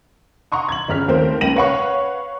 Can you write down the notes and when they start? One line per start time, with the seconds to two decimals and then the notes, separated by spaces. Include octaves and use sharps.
0.52 F#5 A#5 C6 C#6 D#6
0.69 G#6 F#7
0.88 G1 C#3 A#5 F6 B6
1.08 D#2 A3 C4 A#4 C5
1.41 C#2 A#3 A#6 D#7 F#7
1.56 B4 C#5 F5 F#5 B5 C#6